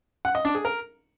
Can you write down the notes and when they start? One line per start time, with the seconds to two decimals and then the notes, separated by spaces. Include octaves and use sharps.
0.25 F#5
0.35 D#5
0.45 D4
0.55 G#4
0.65 A#4